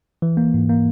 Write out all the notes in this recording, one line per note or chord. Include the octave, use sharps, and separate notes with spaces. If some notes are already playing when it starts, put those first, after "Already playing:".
E3
A#3
G#2
A#3